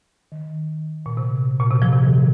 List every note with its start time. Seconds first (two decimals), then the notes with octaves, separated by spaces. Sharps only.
0.32 D#3
1.06 A#2
1.17 C3
1.60 A#2
1.71 C3
1.82 F3
1.93 C3
2.03 D#3